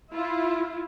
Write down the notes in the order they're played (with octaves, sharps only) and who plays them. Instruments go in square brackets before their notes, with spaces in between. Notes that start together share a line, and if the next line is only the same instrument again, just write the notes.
[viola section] E4 F4